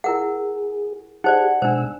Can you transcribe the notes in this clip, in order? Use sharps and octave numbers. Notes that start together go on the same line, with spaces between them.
E4 G#4 A#4 F#5
D#4 G4 G#4 C5 D5 F#5
B2 G#3 D4 C5 E6